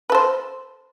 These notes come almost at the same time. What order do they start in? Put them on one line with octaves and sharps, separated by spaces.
B4 A4 C5